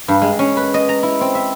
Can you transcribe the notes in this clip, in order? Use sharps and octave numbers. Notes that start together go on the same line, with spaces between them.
G2
G#3
C#4
B4
D#5
A#5
E4
C4
E5